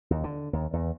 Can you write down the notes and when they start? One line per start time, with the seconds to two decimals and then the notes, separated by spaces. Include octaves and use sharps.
0.11 D#2
0.24 D3
0.53 D#2
0.73 E2